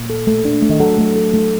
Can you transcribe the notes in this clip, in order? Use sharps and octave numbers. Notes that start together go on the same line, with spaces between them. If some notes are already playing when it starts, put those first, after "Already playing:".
Already playing: A#2
A4
A3
D4
A3
D#3
F#3 A4
A3
A4
A3